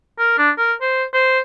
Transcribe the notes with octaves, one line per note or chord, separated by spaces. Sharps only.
A#4
D4
A#4
C5
C5